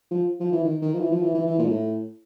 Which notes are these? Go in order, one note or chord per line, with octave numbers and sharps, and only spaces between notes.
F3
F3
E3
D#3
D#3
F3
E3
F3
E3
E3
E3
A#2
G#2
A2